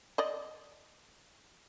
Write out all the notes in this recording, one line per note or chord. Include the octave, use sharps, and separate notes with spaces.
D5 D#5